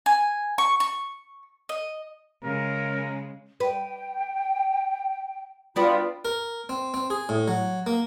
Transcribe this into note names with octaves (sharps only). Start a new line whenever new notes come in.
G#5
C#6
C#6
D#5
C#3 G#3 A#4
B4 G5
B3 D4 F4 F#4 G5 B5
A#4
C4
C4
G#4
A2
F#3
A#3